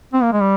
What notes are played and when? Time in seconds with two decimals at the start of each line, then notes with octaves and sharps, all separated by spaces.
0.13 C4
0.23 A#3
0.32 G#3
0.41 G3